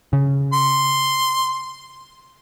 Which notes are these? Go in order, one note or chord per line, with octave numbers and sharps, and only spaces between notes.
C#3
C6